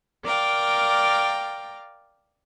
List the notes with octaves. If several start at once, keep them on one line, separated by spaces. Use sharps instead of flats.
A#4 D5 F5 G5